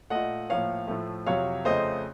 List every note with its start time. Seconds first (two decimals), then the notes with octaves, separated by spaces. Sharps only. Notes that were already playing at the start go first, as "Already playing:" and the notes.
0.10 A#2 A3 D#5 F#5
0.50 A2 F3 A#3 C#5 F5
0.87 A2 F3 A3
1.26 F2 C3 F#3 C#5 F5
1.65 F2 C#3 A3 C5 D#5